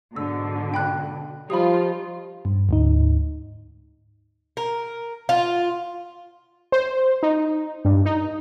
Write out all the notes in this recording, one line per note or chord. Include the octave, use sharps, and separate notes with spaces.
G#2 B2 D3 E6
G5 B5 F#6
F3 G3 D#4 F4 G4 B5 D#6
G2
D2 G#2 D#4
A#4
F4
C5
D#4
G2
D#4